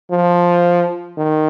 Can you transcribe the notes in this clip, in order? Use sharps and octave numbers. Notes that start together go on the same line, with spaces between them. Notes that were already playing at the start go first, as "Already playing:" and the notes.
F3
D#3